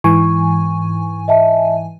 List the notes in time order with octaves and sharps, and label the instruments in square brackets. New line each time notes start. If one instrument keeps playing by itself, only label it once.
[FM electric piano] G#2 E3 G#5 [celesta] C#6
[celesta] D#5 E5 A5